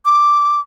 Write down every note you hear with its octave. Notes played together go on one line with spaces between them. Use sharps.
D6